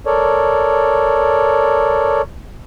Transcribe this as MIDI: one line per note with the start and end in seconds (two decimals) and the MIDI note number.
0.06 2.22 69
0.06 2.22 70
0.06 2.22 73
0.06 2.22 74